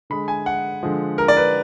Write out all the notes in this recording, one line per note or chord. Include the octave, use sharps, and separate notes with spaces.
D3 G#3 B5
G#5
F#5
D3 F3 G#3
A#4
D5
B4